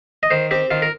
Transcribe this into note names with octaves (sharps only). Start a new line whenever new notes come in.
D#5
D#3 C5
C4 G4
D#3 F4
A#4